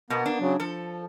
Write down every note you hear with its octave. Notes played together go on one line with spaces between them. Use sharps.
B2 A#3 B3
D4
C#3 F#3
F3 A4